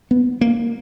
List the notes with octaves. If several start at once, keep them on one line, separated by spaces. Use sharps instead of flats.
B3
A#3